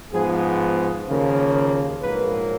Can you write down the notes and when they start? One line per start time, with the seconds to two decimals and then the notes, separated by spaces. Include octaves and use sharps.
0.12 G#2 F3 B3 G#4
1.07 D#2 C#3 F3 A#3
2.02 A#1 G#2 F#3 A#3 B4